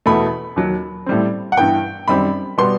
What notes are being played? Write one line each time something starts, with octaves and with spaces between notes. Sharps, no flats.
E2 B2 A3 B5
D#2 D#3 F#3
A2 G3 C4
F#5
G2 E3 B3 G5
F#2 D#3 G3 C4 B5
B2 G3 B3 C6